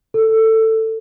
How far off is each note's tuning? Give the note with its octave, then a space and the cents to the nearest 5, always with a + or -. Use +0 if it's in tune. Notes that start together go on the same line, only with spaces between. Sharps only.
A4 +15